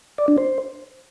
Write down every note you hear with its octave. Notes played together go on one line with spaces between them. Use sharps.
D5
D4
C5